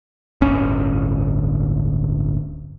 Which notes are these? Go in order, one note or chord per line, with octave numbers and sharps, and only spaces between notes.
D1 G1 C#4